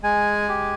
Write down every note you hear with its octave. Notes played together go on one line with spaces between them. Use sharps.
G#3 G#5
G4